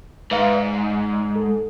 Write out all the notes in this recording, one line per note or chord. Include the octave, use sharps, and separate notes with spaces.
G#2 B4 E5 F5
D5
A4